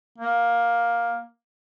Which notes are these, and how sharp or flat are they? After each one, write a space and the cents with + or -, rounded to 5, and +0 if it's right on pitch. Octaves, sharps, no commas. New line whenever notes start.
A#3 +10